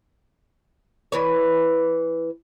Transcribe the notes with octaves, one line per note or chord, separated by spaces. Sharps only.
E3 B4 C#5